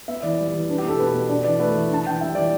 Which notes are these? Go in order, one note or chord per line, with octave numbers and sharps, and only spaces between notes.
B3 E5
E3 D5
G3
E3
D4 B4
G4
B2 A4
B3 B4
B2
D4 D5
E3 D5
A3 B4
E3
D4 A5
E3 G5
G3 E5
E3 D5